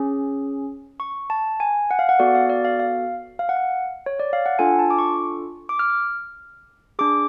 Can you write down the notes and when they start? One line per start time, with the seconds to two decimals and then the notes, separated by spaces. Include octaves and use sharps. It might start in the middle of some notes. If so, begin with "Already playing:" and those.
Already playing: C#4 G#4
1.00 C#6
1.30 A5
1.60 G#5
1.91 F#5
1.99 F5
2.09 F#5
2.19 B3 F#4 A4 D5
2.35 F5
2.50 D5
2.65 F5
2.80 F5
3.39 F5
3.49 F#5
3.57 F5
4.06 C#5
4.20 D5
4.33 F5
4.46 F#5
4.59 D4 F4 A4 G#5
4.79 A5
4.90 D6
4.99 C#6
5.69 D6
5.79 F6
6.99 D4 G#4 D6